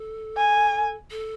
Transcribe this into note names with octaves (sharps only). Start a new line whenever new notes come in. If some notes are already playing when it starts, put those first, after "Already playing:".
Already playing: A4
G#5
A4